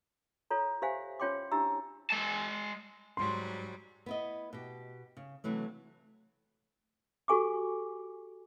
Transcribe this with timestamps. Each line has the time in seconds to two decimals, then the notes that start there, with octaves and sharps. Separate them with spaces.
0.51 F4 A4 C#5 A#5
0.82 G4 C5 E5 F5 G#5
1.20 C#4 F4 C#5 G5 C6 D6
1.51 D4 E4 G4 E5 A#5 E6
2.10 G#3 A5
3.17 G#2 F#3 G3 C6
4.06 B3 E4 D#5
4.53 B2 G4
5.17 C#3
5.44 C3 E3 F#3 A3
7.28 F#4 G4 A4 G#5 C#6 D6